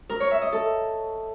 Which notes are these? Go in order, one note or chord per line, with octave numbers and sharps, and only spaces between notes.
A#4
C#5
E5
D#5
A4